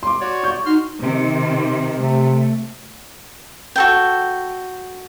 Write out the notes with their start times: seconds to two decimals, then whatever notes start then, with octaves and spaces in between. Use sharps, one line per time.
0.03 C6 D6
0.21 F#4 C#5 D5
0.43 C#6 G6
0.66 D#4 F#4 C6 F6
1.03 C3 D#3
1.99 C3 A3
3.76 F#4 A4 G5